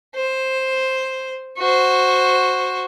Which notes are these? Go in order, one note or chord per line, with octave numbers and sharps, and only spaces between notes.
C5
F#4 C5